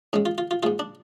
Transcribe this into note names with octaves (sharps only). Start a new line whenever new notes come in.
G#2 G#3 C#4
F4
F4
F4
G#2 G#3 F4
D4